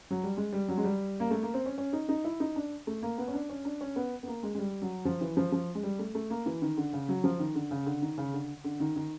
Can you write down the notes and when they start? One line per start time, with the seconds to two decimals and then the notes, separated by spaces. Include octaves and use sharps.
0.11 F#3
0.23 G3
0.37 G#3
0.53 G3
0.68 F#3
0.78 G#3
0.84 G3
1.20 A#3
1.31 A3
1.43 A#3
1.54 C4
1.66 C#4
1.78 C#4
1.93 D#4
2.09 D#4
2.24 E4
2.40 D#4
2.56 D4
2.87 A3
3.02 A#3
3.18 B3
3.27 C#4
3.34 D4
3.49 C#4
3.65 D4
3.81 C#4
3.96 B3
4.23 B3
4.28 A#3
4.43 G#3
4.55 G#3
4.59 G3
4.82 F#3
5.05 F3
5.21 E3
5.37 F3
5.52 F3
5.75 G#3
5.83 G3
5.99 A3
6.15 A3
6.30 A#3
6.46 E3
6.62 D#3
6.77 D3
6.93 C#3
7.09 F#3
7.24 F3
7.40 D#3
7.55 D3
7.71 C#3
7.86 D3
8.02 D#3
8.18 C#3
8.33 D3
8.64 D3
8.80 D#3
8.96 D#3